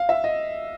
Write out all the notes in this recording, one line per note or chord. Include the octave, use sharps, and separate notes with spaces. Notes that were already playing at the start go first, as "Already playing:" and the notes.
Already playing: F5
E5
D#5